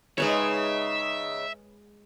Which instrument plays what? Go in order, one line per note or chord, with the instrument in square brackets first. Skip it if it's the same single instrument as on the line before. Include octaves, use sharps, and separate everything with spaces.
[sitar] C#3 D#4 [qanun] G#3 B4 C#5 [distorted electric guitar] E5